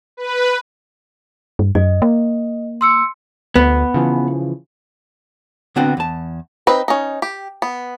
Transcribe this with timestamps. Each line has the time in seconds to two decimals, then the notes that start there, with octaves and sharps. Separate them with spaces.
0.17 B4
1.59 G2
1.75 F#2 D#5
2.02 A#3
2.81 C6 E6 C#7
3.56 D2 B3
3.94 C#3 E3 F3
5.76 D3 B3 C4 D4 F#4
5.97 E2 A5
6.67 C4 D#4 B4
6.88 C#4 D#4
7.22 G4
7.62 B3